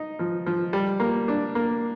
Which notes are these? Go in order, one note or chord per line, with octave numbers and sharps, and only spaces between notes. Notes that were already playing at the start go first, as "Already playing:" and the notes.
Already playing: D#4
F3
F3
G3
A#3
D4
A#3